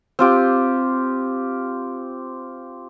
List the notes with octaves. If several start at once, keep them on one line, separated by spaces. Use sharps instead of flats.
C4 F4 G4